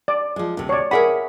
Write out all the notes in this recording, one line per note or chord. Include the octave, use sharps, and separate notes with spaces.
D5
F3 G#3
D2 C3
C#5 D5
G#4 A#4 E5 F#5 B5